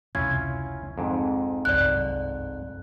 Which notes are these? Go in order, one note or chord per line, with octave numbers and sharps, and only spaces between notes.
F1 C#2 C3 C#4 E4 F4 G#6
F2 G#2
G1 C2 F#2 D5 F#6